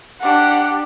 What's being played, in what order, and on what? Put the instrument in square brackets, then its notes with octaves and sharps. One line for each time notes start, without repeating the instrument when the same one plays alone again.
[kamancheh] D4 G4 [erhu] F#5